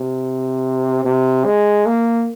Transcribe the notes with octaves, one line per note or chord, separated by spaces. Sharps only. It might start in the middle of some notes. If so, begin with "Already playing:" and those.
Already playing: C3
C3
G#3
A#3